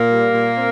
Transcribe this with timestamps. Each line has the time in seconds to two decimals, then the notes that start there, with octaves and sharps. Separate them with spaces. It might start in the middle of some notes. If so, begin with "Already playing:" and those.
Already playing: A#2 A#3 A#4
0.11 G3
0.34 A#2
0.56 C4